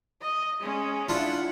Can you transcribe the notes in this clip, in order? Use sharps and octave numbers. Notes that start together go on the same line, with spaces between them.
D#5
G#3 C#4
D4 E4 F4 F#5